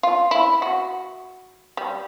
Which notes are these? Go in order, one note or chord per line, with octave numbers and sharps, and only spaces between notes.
F4
E4
F#4
G3